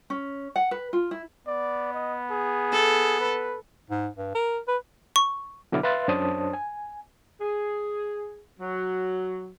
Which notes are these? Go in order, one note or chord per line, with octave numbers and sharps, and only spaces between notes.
C#4
F#5
B4
F4
E4
B3 D5
D#5
G#4
A4
B4
G#2
G2
A#4
B4
C#6
B2 D3 F#3 E4 D6 F6
B4 E5 F5 C6 F#6 A6
F#2 D4 C5 C#5 A5 D#6
G#5
G#4
F#3